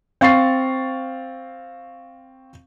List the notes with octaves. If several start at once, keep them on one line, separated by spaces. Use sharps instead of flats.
C4 F5 C#6 A6 C7